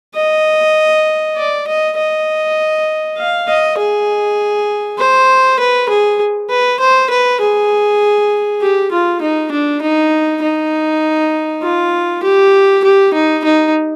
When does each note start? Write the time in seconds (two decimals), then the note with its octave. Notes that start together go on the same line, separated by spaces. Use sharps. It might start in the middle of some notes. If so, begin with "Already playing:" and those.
0.16 D#5
1.37 D5
1.67 D#5
1.97 D#5
3.18 F5
3.48 D#5
3.78 G#4
4.99 C5
5.60 B4
5.89 G#4
6.50 B4
6.80 C5
7.10 B4
7.41 G#4
8.61 G4
8.91 F4
9.21 D#4
9.51 D4
9.81 D#4
10.42 D#4
11.63 F4
12.23 G4
12.84 G4
13.14 D#4
13.44 D#4